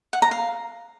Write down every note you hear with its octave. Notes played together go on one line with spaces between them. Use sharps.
F#5
A#5
F5